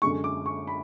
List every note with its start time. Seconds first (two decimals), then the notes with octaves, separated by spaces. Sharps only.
0.02 F#2 D3 G#3 C#6
0.24 D6
0.46 C#6
0.67 B5